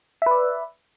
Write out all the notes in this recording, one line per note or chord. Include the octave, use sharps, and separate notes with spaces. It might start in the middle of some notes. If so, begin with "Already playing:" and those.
B4 D5 E5